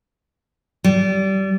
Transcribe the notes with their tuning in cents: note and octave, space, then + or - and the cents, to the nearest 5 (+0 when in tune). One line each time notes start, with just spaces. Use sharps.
G3 -25